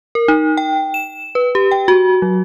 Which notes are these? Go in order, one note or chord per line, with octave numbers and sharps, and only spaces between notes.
A#4
D#4
G5
E7
B4
G4
G5
F#4
F#3